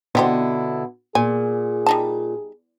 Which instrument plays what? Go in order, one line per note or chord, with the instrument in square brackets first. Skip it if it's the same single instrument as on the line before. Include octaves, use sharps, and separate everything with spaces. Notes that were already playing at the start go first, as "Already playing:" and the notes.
[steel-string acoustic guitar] B2 D3 E4 [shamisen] C4 G4 C5
[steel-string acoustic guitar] A#2 [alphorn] G#4 [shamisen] G#5
[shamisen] G3 D#4 A5